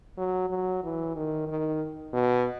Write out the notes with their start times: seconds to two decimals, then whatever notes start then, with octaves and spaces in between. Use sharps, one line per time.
0.18 F#3
0.50 F#3
0.83 E3
1.16 D#3
1.48 D#3
2.13 B2